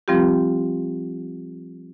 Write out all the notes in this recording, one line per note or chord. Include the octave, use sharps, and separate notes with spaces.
F3 G3 C4 F4 G4